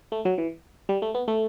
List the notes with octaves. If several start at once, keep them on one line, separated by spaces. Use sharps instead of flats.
A3
F#3
E3
G3
A3
B3
A3